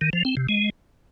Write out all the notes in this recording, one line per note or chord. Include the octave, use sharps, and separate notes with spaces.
D#3
F3
C4
C3
G#3